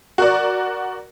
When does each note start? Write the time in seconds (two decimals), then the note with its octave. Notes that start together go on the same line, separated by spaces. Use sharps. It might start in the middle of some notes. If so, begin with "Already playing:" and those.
0.18 F#4 A#4 D5